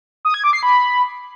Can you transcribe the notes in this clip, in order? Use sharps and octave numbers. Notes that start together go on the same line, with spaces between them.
D#6
G#6
D6
C7
B5